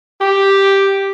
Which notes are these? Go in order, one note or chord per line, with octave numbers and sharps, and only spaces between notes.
G4